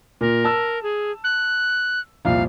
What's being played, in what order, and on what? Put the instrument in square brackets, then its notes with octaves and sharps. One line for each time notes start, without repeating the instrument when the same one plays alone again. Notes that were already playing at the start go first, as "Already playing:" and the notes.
[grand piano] A#2 [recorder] A#4
[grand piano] A5 E6
[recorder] G#4
F#6
[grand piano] C2 F2 A#2 [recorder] F5